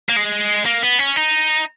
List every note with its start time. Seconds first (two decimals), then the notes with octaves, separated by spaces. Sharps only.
0.09 A#3
0.16 G#3
0.66 A#3
0.83 B3
0.99 C#4
1.16 D#4